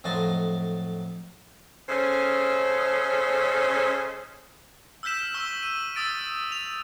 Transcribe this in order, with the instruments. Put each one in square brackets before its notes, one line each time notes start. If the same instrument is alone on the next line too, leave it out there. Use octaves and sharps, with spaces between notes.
[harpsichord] F2 A2 F#3 D#5 A5 C6
[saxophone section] C#3 C#4 A4 C5 D#5
[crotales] E6 F6 G6 B6 E7
C#6 E6 G7
D#7
D#6 E6 A6 D7
F7